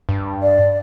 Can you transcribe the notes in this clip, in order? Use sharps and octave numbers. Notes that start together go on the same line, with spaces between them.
G2
D5